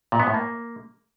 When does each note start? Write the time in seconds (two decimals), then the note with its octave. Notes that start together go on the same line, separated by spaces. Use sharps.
0.12 A#2
0.20 B3
0.27 A2
0.34 A#3